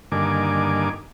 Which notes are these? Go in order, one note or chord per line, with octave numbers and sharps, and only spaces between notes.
G2 D3 D#3 A#3 G#5 D6